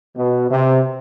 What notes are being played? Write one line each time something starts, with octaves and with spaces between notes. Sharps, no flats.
B2
C3